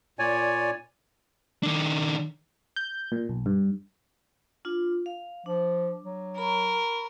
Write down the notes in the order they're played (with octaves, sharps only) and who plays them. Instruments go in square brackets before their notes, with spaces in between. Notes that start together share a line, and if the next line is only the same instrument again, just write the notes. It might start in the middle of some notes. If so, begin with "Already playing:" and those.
[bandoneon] A#2 C#5 D5 G#5
[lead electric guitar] D#3 D4
[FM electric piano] G6
A#2
B1
G2
[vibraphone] D4 F4
F5
[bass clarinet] F3 [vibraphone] D4
[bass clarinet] F#3
[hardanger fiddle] A#4 [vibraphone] B5 C#6